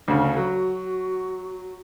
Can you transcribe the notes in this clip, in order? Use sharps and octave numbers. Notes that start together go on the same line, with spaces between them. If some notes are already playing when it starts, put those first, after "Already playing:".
D2 C#3 D4
F#3 F#4